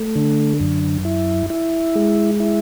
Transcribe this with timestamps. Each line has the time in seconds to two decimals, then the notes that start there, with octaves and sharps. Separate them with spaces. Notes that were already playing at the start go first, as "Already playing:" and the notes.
Already playing: A3
0.16 D3
0.60 F#2
1.05 E4
1.50 E4
1.95 G#3
2.40 E4